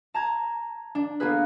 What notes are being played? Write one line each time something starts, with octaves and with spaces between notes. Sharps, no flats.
A5 A#5 G#6
D4
A#3 B3 F4 G#4 B4